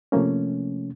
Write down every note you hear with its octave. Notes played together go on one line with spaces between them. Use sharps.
C3 F3 A3 A#3 C#4